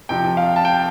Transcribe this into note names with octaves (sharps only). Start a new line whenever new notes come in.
F2 C3 F3 G5
F5
A5
G5